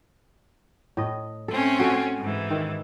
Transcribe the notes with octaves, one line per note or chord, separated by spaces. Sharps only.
A2 D#5
A3 C4 C#4 A4
F#4 A4
G#2 E3
D#3